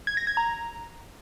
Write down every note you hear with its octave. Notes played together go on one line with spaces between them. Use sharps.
G#6
A#6
G#6
A#5